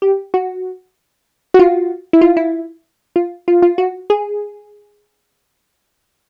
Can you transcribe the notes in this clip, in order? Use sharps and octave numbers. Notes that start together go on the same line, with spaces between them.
G4
F#4
F#4
F4
E4
F4
E4
F4
F4
F4
F#4
G#4